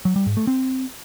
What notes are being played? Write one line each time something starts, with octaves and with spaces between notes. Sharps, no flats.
F#3
G3
G#2
A3
C4